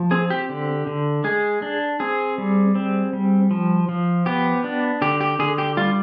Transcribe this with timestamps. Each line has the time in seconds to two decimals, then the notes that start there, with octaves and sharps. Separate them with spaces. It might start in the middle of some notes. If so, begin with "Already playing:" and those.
Already playing: F3
0.11 C4 G#4
0.30 G4
0.49 D3
0.87 D3
1.24 G#3 G#4
1.62 D4
2.00 C4 G#4
2.38 G3
2.75 C4
3.13 G3
3.51 F3
3.89 F3
4.26 B3 G4
4.64 D4
5.02 D3 G4
5.21 G4
5.39 D3 G#4
5.58 G4
5.77 G3 F4